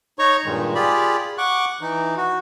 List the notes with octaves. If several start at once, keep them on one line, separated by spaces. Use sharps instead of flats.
D#4 C#5 A#5 C#6
G2 A#2 D#3 G#3
F4 G4 G#4 D5 B5
F#5 C#6 D6 F#6
E3 D#4
F#4